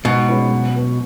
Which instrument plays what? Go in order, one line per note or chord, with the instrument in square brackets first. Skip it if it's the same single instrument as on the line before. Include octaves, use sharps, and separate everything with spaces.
[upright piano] G#2 [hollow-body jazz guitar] B2
[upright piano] G#3 C#4 E4 B4
F#3
B3 F#4 B4